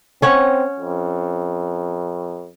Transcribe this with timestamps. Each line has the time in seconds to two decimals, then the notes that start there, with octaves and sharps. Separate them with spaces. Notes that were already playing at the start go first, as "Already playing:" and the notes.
0.22 C4 C#4 C#5 F#5
0.80 F2